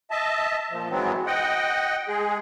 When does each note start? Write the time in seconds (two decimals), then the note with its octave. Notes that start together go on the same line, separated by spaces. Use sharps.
0.11 D#5 E5 A5
0.71 A#2 F3
0.90 G#2 E3 F#3 G#3 B3 C4
1.26 D#5 F#5 G5
2.08 G#3 G#4